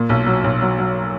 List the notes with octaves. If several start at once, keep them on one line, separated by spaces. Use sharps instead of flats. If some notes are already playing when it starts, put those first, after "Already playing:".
Already playing: A#2
B1
F#3
B1
F#3
F#3